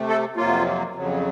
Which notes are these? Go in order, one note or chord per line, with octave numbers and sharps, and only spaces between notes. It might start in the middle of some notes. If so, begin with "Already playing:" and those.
Already playing: C3 A3
A4
F2 C3 F#3 A#3 F4
F2 C#3 F#3